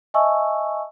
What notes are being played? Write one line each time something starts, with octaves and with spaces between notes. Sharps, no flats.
D#5 E5 G#5 A5 C#6 E6